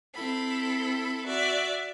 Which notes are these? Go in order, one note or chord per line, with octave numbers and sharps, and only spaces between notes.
C4 E4 A4 B5
F#4 D5 E5